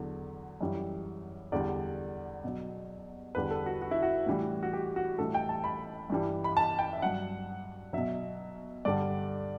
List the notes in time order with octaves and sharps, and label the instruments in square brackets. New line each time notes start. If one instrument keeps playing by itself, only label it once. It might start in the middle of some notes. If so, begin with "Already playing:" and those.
Already playing: [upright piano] E2 D3 F#3
F#2 E3 G3
E2 D3 G3 D5
B2 F#3
E2 D3 G3 B4
A4
F#4
F#4
E4
F#4
A2 E3 G3
F#4
G4
F#4
A2 E3 G3 A4
G5
A5
B5
G2 E3 G3
B5
A5
G5
E5
G2 F#3 F#5
B2 F#3 E5
G2 D3 G3 D5